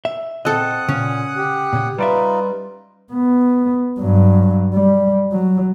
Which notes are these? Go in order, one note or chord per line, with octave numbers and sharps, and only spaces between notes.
E5
A#2 C4 A4 D#5 F#5 D#6 F#6
A#2 C#3 C#4
G4
A#2 C#3
G3 D#4 F4 B4 D5 E5
B3
G2 F#3
G3
F#3